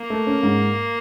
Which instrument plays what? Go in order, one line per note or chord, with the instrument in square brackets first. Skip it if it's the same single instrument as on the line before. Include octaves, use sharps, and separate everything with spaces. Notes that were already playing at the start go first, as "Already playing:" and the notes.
Already playing: [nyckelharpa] A#3
[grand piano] A3
C#4
G#2